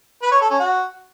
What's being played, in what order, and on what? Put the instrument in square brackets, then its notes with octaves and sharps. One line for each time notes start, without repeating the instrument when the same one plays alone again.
[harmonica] B4
C#5
A4
C#4
F#4